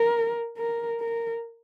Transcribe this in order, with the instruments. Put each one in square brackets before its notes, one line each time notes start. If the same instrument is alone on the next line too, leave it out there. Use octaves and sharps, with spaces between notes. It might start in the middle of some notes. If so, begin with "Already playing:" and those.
Already playing: [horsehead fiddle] A#4
A#4
A#4